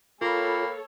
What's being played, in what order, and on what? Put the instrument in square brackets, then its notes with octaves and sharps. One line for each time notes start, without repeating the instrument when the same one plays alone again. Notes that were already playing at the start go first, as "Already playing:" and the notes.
[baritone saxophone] A#3 [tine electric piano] F4 [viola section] A4 C#5 [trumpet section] F5 G5 B5